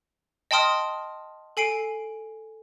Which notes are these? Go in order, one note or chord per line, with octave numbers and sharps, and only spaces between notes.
D#5 G5 A5 C6 D#6 F6
A4 G#5 C7 D7